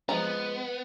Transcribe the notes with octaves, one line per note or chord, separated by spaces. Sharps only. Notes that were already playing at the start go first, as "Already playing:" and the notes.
F3 G#3 B3 A#5